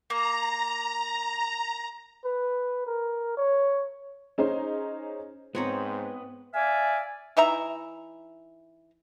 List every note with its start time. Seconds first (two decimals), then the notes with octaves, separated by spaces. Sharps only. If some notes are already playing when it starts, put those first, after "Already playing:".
0.10 A#3 A#5
2.25 B4
2.87 A#4
3.37 C#5
4.38 C#4 D#4 G#4 C5
5.55 G#2 B3 C4 C#5 A#5
6.54 D5 E5 F5 G#5
7.37 E3 D#4 E5 A#5